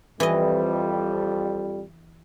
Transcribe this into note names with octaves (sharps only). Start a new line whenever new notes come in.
F2 E3 G3 D#5